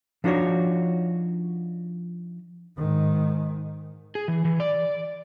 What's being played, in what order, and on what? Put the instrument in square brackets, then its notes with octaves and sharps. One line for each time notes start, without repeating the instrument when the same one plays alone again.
[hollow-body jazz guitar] F3 D4 D#4 F#4 C#5
[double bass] G#2 D#3
[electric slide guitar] G#4
E3
E3
D5